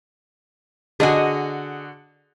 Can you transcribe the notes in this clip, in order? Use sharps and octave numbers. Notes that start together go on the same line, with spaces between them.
D3 F#4 G#4 D#5 G#5